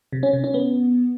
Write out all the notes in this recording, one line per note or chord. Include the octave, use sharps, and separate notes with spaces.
C3
C#4
C3
C#4
B3